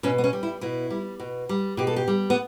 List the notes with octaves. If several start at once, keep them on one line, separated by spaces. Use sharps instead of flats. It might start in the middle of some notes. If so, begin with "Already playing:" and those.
B2 C#4
B3
C#4
G3
E4
B2 E4
G3
B2
G3
B2 G4
A4
G4
G3
B3